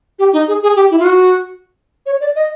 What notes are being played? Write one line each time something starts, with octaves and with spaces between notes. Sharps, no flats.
G4
D#4
G#4
G#4
G4
E4
F4
F#4
C#5
D5
D#5